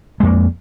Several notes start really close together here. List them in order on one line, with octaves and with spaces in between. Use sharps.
G#3 F2 A#3